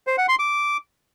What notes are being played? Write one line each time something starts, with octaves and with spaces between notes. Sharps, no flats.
C5
F#5
C6
D6